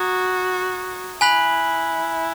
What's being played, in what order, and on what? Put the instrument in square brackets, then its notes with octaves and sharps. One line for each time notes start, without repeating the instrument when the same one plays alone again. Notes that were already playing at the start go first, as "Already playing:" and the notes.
Already playing: [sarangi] F#4 [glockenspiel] A#5 D#6 G#6
[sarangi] E4 [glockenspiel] G#5 B5 F#6 B6 F#7